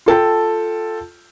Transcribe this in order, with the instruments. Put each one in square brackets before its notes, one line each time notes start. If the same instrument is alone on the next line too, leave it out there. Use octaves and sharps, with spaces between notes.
[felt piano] F4 A4 G5 A5